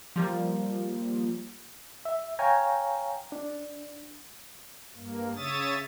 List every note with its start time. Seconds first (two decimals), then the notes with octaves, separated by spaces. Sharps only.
0.16 F3 G3 A#3
2.05 E5
2.39 C#5 F5 G5 G#5 A#5
3.32 D4
4.97 G2 A#3
5.36 C#3 C#5 E5 D#6 A6